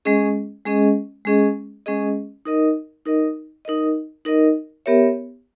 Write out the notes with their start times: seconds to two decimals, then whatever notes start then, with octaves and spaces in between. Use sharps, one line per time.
0.05 G#3 C#4 G#4 D#5
0.66 G#3 C#4 G#4 D#5
1.25 G#3 C#4 G#4 D#5
1.86 G#3 C#4 G#4 D#5
2.45 D#4 A#4 D#5
3.05 D#4 A#4 D#5
3.65 D#4 A#4 D#5
4.25 D#4 A#4 D#5
4.86 B3 G4 A#4 C#5 E5